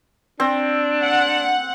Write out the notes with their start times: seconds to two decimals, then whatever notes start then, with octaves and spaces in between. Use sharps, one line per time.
0.40 C4 D4
1.02 F#5